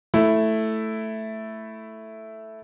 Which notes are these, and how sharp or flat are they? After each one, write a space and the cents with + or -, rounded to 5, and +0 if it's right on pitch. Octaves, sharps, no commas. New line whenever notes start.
A3 +0 E4 +0